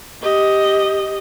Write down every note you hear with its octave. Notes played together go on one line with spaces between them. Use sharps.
G4 D#5